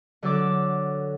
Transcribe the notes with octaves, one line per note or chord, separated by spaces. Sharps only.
D3 F#3 A4 D6